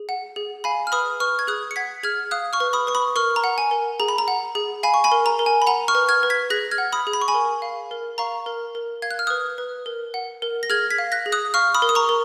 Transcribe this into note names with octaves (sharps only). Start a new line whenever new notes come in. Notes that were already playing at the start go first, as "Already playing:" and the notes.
Already playing: G#4
F#5
G#4
F5 G#5 B5
F6
B4 B5 D#6
B4 C#6 F6
G#6
G#4 D#6 F#6
C#7
F#5 G#6 B6
G#4 F6 G#6
F5 D#6 F#6
C#6 F6
B4
B5 D#6
B4 C#6
B5 D#6
A#4 C#6 F6
A#5
F#5
G#5
A#4
G#4 A#5
B5
A#5
F#5
G#4
F5 G#5 B5
C#6
G#5 B5
A#4
A#5
A#4
G#5
B5
F#5 A#5
C#6 F6
B4
F6 G#6
B4
G#6 B6
G#4 F#6 A#6
F6 G#6
F#5
B5 D#6
G#4
B5
C#6
G#5 B5
A#4
F5
A#4
F5 A#5 C#6
A#4
A#4
F5 G#6
F#6
F6
B4 D#6 F#6
B4
A#4
F#5
A#4
A#6
G#4 F6 G#6
G#6 B6
F5
F#6 A#6
G#4
D#6 F#6
F5 C#6 F6
B5 D#6
A#4
D#6
A#5 C#6
A#4